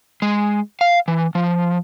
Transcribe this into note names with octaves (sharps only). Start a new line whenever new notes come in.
G#3
F5
E3
F3